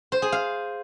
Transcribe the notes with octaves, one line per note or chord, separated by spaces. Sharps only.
C5
G#4
F5